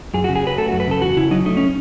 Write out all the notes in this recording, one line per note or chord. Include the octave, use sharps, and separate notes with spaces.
F#2 G#4
C#3 F#4
G#4
F#3 B4
A3 A4
F#2 F#4
B4
C#3 A4
E2 F#4
C#3 E4
F#3 D#4
A3 D#4
C#4